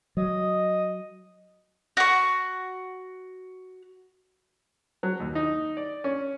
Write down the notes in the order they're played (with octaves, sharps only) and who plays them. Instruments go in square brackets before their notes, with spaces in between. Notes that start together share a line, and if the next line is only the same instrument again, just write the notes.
[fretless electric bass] F#3 [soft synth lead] D#5
[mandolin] F#4 C#6
[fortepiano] F#3
D#2
D#4
D5
C#4